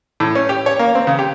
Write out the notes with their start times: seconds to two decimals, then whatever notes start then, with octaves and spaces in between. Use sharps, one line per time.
0.20 A2
0.35 C#4
0.49 G4
0.66 C#5
0.79 A#3
0.95 C4
1.07 C#3
1.19 G4